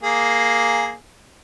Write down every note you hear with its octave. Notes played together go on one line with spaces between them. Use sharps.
A#3 G#4